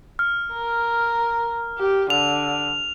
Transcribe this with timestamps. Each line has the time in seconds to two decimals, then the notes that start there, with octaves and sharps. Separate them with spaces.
0.19 F6
0.53 A#4
1.78 G4
2.10 D3 F7